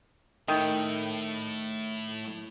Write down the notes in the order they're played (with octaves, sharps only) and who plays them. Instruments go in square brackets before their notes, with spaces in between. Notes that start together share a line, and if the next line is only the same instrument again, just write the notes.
[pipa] D#3 [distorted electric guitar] A3 E4